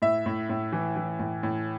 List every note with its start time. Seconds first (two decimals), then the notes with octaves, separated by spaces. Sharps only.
0.02 A2 E5
0.26 A2
0.50 A2
0.72 E3
0.96 E3
1.19 A2
1.43 A2